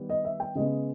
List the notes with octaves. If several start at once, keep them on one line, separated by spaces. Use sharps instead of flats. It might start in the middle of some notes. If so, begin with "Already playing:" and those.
Already playing: D#3 G3 B3
D#5
E5
G5
C#3 G#3 B3 D#5